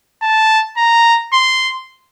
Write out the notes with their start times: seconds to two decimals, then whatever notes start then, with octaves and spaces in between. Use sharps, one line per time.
0.22 A5
0.77 A#5
1.33 C6